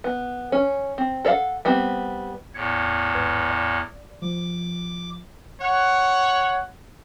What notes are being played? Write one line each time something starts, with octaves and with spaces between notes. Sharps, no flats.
B3
C#4
C4
A4 C#5 D5 F5 F#5
G3 B3 C4
E2 A2 G#6 C#7
G#1 B4 G#6
D5
F3 D6
C#5 F#5